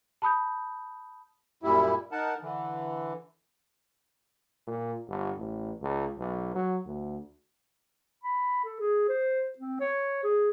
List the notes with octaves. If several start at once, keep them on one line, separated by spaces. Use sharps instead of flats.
A5 B5 D#6 G6
F#2 A#2 G3 E4
D#4 A#4 F#5 A5
D3 E3
A#2
G1
A1
C#2
B1
F#3
D2
B5
A4
G#4
C5
C4
C#5
G#4